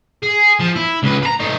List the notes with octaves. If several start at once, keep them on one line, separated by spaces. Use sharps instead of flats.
G#4
F3
E4
C#2 B4
B4 A#5
A3 D#4